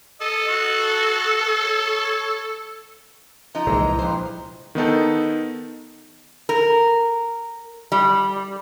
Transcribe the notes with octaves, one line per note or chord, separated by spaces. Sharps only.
A4 D#5
F#4
C#5
F3 D#4 A#5
C2 A#2 D#3 E3 G#3 D#5
G2 F3 C5
D#3 B3 D#4 A4
A#4
G3